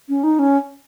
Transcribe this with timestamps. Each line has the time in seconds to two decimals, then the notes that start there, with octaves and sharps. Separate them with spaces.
0.09 C#4
0.23 D#4
0.39 C#4